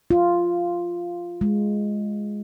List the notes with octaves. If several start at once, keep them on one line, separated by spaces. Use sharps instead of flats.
F4
G#3